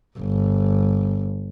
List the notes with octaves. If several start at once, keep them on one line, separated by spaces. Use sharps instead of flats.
G1